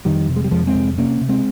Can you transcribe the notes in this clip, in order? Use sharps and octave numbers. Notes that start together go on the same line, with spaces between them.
F2 D#3 G3
C3
G#3
G3
F2 F3 G#3
G#3 C4
C3
C3 A#3 C#4
C3
G#3 C4